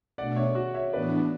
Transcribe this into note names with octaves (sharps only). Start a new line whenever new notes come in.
B2 A3 D4 D5 F#5
C#5 E5
F#4
C#5 E5
A2 E3 B3 D4 B4 D5